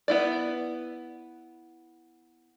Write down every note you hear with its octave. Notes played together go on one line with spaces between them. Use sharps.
B3 E4 D5